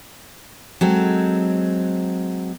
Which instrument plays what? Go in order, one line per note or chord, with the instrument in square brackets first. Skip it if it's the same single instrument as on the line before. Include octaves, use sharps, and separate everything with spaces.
[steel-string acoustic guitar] F#3 G#3 C4 A4